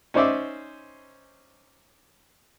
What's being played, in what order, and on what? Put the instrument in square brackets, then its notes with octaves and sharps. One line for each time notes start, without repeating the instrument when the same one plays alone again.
[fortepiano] C#4 D#4 C5 D5 E5